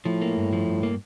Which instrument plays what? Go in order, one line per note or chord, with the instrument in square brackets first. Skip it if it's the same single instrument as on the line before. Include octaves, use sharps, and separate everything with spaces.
[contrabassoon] A2 [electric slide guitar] F3
[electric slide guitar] A#3
G2
F3
G2
A#3